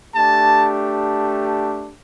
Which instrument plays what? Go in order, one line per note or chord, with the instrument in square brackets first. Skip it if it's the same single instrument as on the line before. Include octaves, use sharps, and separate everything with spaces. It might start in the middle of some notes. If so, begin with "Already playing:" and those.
[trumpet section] A3 D4 G4 A5